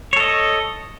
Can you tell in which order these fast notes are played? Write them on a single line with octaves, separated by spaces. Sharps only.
C#5 A4 D#5